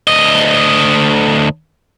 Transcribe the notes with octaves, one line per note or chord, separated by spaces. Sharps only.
D2 D#5